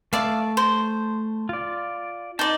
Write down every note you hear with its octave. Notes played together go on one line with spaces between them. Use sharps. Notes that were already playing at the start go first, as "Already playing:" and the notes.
A3 D5 E5 F5 A5
C5
F4 D5
D#4 D5 A5